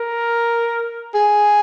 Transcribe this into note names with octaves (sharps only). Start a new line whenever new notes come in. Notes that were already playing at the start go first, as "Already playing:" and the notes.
Already playing: A#4
G#4